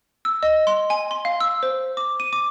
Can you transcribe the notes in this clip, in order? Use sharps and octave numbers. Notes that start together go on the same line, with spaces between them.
E6
D#5
C6
G#5
C6
F5
E6
C5
D6
D#7
D6